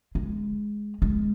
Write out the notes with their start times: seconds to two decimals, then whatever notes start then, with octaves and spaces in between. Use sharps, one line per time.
0.15 G#3
1.02 G#3